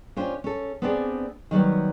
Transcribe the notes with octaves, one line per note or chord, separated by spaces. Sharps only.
C#4 D4 F4 G4 C5
C#4 A4
B3 C4 D4 G4 G#4 D5
D#3 F#3 G3 B3